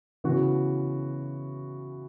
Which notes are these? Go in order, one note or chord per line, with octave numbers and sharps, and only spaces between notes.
C#3 E3 B3 F#4